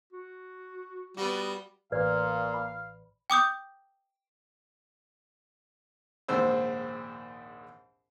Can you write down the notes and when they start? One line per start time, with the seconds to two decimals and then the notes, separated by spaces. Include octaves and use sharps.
0.13 F#4
1.17 G3 B3 F#4
1.92 A1 A#2 B4 D5 F5
2.54 B5
3.30 G5 D6 D#6 G6
6.28 A#1 D#2 G#2 C4 C5 E6